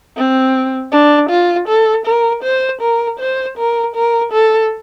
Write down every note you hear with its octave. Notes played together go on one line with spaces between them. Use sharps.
C4
D4
F4
A4
A#4
C5
A#4
C5
A#4
A#4
A4